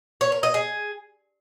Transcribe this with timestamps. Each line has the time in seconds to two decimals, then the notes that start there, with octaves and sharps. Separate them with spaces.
0.21 C#5
0.32 A#4
0.43 D#5
0.54 G#4